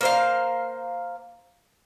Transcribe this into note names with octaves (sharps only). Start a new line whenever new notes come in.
A#3 C5 F5